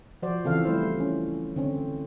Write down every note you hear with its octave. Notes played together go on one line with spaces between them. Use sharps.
F3 F#4 C5 D5
C#3 E3 C4 A4 F5
G3 A3 E4 C5
C#4
D3 C4 C#4